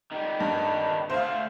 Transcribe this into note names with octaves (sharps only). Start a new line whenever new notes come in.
D#3 G3
G2
D2 A3 C5 F5